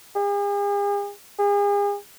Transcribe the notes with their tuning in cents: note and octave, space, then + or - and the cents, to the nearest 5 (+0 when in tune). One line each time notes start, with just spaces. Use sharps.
G#4 -45
G#4 -40